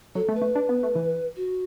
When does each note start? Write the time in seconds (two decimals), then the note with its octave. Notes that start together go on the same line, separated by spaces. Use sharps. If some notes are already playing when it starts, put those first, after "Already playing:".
0.15 F#3 A4
0.29 A3
0.35 B4
0.42 A3
0.55 D4
0.69 B3
0.83 A3
0.95 E3
1.36 F#4